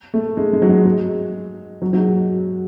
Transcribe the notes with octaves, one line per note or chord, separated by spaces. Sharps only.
A3
G#3
G#3
F#3
G#3
G#3
F#3
F#3
G#3